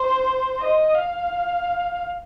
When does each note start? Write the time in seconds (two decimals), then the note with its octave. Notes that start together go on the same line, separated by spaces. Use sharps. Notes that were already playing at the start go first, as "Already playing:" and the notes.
Already playing: C5
0.60 D#5
0.95 F5